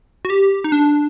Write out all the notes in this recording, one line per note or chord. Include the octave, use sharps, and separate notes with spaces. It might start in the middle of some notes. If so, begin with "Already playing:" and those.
F#4
G4
D#4
D4